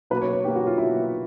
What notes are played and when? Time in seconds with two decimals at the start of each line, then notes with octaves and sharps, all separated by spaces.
0.10 B2 F#3 A#3 B4
0.21 C#5
0.33 C#5
0.44 B2 F#3 A#3 G4
0.55 F#4
0.67 F4
0.78 B2 F#3 A#3 E4